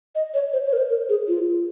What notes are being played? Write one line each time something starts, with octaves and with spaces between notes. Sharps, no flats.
D#5
C#5
C5
C#5
A#4
C5
A#4
G#4
F4